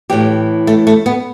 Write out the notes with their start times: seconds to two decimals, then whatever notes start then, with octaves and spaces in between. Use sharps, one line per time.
0.10 A2 E3 G4
0.67 A3
0.87 A3
1.06 B3